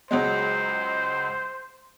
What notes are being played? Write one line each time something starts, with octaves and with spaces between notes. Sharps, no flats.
C#2 F#3 G#3 C5